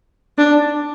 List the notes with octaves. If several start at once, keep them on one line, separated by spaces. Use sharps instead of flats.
D4